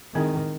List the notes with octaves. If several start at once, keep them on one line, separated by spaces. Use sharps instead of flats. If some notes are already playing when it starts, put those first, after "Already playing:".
D#3 G#3 C4 E4 G#4